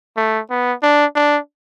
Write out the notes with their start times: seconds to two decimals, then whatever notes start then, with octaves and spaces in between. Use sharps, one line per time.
0.17 A3
0.50 B3
0.83 D4
1.15 D4